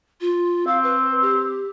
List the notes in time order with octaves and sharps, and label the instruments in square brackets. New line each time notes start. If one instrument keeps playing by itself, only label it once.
[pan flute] F4
[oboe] C4 [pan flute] F5
[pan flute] B4
G4